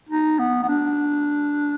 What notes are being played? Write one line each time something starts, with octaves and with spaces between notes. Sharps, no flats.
D#4
B3
B3
D4